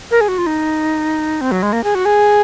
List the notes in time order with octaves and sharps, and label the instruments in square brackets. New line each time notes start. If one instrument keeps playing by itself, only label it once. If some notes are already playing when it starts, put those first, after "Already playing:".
[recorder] A#4
G#4
F#4
F4
D#4
C4
F#3
G#3
A#3
G#4
F#4
G#4